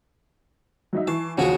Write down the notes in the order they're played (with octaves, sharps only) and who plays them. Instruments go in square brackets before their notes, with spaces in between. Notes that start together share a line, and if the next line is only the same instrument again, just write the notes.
[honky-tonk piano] F#3 D#4 E5
[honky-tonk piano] E3 C#6 C7 [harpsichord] A5
[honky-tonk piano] D#2 C#3 F3 [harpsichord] F#3 F#4 G#4